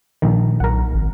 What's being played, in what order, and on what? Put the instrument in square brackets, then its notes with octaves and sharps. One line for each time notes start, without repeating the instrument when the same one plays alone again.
[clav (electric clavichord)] A#1 D#3
[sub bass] B1 [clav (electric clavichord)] A#4 F#5
[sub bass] G#1